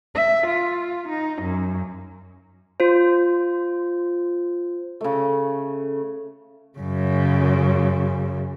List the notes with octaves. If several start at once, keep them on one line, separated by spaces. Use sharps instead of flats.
E5
F4
D#4
F#2
F4 C5
C#3 A3
F#2 C#3